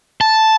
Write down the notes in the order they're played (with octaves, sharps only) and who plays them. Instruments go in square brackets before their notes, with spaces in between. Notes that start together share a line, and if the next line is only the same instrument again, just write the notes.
[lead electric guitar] A5